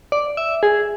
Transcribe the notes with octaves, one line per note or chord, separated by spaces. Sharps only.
D5
E5
G#4